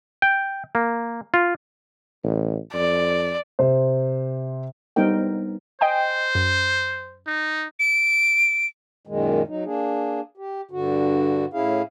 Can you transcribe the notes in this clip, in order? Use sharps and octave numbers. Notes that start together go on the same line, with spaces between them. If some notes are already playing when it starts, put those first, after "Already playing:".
G5
A#3
F4
A1
F2 D5
C3 C5
G3 B3 C4 D#4 A#4 G5
C5 D#5 G5 G#5
F#2
D#4
D7
F#2 A#2 D#3 G#3
F#3 D#4
A#3 D4 G#4
G4
G2 D3 F#4
A2 C#4 E4 G#4 F5